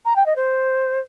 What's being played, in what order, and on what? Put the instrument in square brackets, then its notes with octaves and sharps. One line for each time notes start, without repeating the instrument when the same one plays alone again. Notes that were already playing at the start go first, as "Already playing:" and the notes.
[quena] A#5
G5
D#5
C5